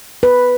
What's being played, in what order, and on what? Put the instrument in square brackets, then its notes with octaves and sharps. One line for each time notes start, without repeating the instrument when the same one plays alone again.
[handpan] B4